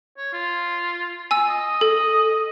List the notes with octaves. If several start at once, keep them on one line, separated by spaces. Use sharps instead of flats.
C#5
F4
G#5 E6
D#5
A4